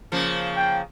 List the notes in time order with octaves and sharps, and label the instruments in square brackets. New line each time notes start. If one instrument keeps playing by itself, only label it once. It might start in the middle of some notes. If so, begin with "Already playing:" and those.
[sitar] C#3 F3 A#3
[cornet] G5